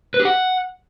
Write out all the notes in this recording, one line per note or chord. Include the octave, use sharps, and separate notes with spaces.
B4
G4
F#5